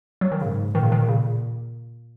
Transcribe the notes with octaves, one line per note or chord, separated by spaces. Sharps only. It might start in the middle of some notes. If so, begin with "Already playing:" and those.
F#3
D#3
G#2 C#3
A#2 D#3
C#3
D#3
C#3